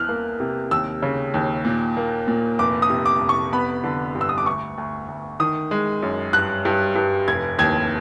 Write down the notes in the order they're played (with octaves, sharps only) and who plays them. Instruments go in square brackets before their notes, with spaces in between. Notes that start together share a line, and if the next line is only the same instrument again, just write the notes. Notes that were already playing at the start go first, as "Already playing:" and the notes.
Already playing: [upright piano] E2 F6 F#6
A#3
C3
D#2 E6
C#3
D#2
A#2
A#3
A#2
F1 D6
D#6
C3
D6
F1
C#6
B3 B5
D3
G2
E6
D#6
D6
D2 C#6
D2
D2
D#3 D#6
G#3
F#2
G2 F#6
G2
G2
F1 G#6
D#2 G#6